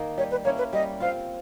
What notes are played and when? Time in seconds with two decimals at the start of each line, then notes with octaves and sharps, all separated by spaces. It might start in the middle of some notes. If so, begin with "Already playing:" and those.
Already playing: D#3 A#3 D#4
0.17 G3 C#5
0.31 B4
0.45 A#3 C#4 E4 C#5
0.58 B4
0.73 G3 D#5
1.00 C4 F4 F5